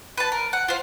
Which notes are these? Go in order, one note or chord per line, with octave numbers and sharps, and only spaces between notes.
B4 A5
A#4
F#5
F4 C5